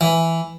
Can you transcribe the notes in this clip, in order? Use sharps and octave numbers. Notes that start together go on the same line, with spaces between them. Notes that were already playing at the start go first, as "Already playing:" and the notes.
E3